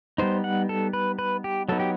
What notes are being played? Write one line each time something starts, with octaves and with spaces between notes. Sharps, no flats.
G3 B3 D#4 C5
F#5
A4
B4
B4
G4
F#3 B3 D#4 A4
G4